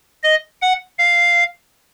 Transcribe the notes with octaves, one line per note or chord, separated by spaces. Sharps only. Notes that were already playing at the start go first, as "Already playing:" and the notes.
D#5
F#5
F5